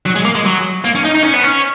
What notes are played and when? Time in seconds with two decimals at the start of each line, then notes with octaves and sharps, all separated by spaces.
0.06 F#3
0.16 G#3
0.25 A#3
0.35 G#3
0.45 F#3
0.85 A#3
0.95 C#4
1.04 D#4
1.15 D#4
1.24 C#4
1.33 B3
1.43 C#4